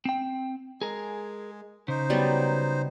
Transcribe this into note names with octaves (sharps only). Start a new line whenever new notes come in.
C4 G5
G#3 G#4 A#4
C#3 D#4 C5
F#3 G3 B3